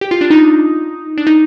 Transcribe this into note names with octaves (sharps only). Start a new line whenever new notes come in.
G4
F4
D4
D#4
D4
D#4